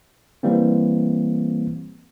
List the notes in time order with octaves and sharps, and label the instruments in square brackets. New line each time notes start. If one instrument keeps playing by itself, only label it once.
[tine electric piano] E3 G3 A#3 C4